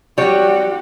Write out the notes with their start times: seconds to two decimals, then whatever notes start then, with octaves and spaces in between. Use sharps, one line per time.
0.18 G3 F#4 G4 C#5